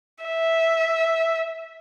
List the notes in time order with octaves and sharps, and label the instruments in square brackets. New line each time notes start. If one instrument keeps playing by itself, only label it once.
[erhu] E5